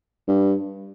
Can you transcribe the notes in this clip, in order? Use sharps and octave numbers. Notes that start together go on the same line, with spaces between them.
G2